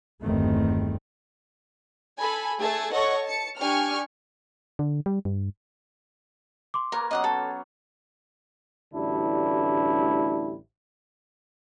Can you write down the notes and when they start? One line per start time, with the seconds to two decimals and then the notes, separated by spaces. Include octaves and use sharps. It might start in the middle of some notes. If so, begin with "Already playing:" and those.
0.24 G1 E2 G2 D#3 A3 C4
2.19 A4 G#5 B5
2.59 A3 G#4 A4 A5 G#6
2.92 A4 C#5 D#5 F#5 C#6
3.25 A5 C#7
3.58 D4 G4 G#5 C#6 F6
4.79 D3
5.06 G3
5.25 G2
6.74 C6 D6
6.92 A#3 A#4 B4 C#5
7.11 F#3 B3 C#4 D#5 F#5 D#6
7.24 A4
8.94 A1 D2 G3 D4 E4